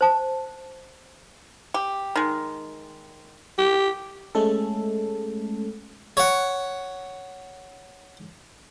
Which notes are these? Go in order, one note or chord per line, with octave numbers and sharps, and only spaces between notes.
C5 A5
G4
D#3 G#3
G4
G#3 A3 C#4 A4
C#5 F#5